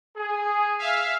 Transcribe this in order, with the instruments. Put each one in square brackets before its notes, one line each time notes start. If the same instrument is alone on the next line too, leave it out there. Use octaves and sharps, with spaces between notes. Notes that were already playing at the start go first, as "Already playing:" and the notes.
[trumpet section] G#4
[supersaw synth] E5 F5